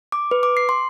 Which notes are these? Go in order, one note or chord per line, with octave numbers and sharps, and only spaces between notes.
D6
B4
D6
C7
C6